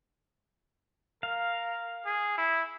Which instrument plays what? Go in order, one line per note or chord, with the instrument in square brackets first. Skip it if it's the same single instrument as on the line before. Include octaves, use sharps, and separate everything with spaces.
[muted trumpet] A#4 [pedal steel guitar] F5
[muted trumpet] G#4
E4